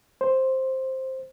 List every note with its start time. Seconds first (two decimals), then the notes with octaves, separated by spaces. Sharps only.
0.21 C5